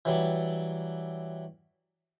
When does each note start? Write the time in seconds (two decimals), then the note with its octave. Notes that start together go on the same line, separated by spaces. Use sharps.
0.05 E3 F#3 G3